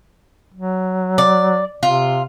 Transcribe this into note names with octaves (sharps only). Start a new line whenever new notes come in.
F#3
D5
C3 F4